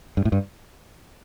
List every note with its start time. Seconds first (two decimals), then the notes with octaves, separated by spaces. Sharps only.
0.17 G2
0.25 A2
0.32 G2